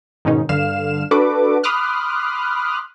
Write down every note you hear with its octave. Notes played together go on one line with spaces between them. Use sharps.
G#2 B2 D#3 C#4 D#4
G2 D3 F5 F6 E7
D4 F#4 A4 B4 D6
B5 C6 D6 D#6 F6 F#6